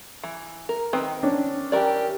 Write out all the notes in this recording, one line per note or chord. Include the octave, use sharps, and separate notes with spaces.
E3
A#4
D#3 C4 B4
C#4 D4
E3 G4 A#4 D5